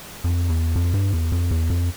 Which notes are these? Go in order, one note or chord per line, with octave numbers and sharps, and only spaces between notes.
F2
E2
F2
G2
E2
F2
E2
F2